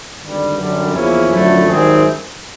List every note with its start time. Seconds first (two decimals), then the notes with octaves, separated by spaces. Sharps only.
0.20 G#1 G2 D3 G3
0.56 F#2 D3 G3
0.93 E2 C#3 F3 A#3 C#4 E4
1.30 F#2 D3 F3 A3
1.66 G#1 F#2 D#3 G3 C4 G#4